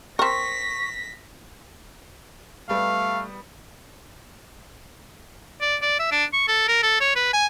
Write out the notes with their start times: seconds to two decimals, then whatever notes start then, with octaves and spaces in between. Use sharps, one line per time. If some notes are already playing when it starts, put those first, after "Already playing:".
0.19 C4 A#4 C#6 A#6 B6
2.69 G3 A3 B3 F5
5.61 D5
5.82 D5
5.99 E5
6.11 D4
6.33 C#6
6.48 A4
6.68 A#4
6.83 A4
7.01 C#5
7.16 B4
7.33 G#5